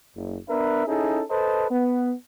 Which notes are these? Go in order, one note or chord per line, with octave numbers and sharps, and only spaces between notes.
F#1
B3 D4 A#4 B4 E5
C#4 D#4 E4 G#4 A4
A4 B4 C5 D#5 A5
B3